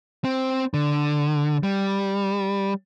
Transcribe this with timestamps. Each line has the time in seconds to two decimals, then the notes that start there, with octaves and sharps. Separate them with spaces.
0.25 C4
0.74 D3
1.63 G3